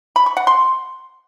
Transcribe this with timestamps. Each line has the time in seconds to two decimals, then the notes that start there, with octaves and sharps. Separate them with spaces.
0.16 B5
0.26 C#6
0.37 F#5
0.47 C6